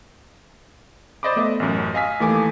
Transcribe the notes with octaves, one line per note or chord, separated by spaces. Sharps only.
C5 D5 D#5 B5 D6
A3 B3 D#5 E5
A1 F#2
D#5 F5 G#5 E6 B6
D#2 E3 A3 G#5 D6